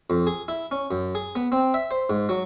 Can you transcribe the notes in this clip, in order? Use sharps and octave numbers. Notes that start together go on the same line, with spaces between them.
F2
G#4
E4
C#4
F#2
G#4
B3
C4
E5
C5
G#2
F#3